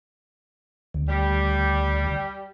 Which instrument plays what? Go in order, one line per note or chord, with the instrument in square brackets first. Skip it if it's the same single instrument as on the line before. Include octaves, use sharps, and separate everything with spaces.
[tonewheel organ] D2
[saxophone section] G3